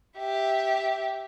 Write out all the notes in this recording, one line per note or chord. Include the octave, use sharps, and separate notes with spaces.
G4 E5